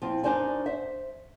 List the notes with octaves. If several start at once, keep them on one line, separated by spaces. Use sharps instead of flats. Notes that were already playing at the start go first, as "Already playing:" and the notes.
F3 C4 E4
F#2 D4 D#4 C5 D5 G#5
C5 E5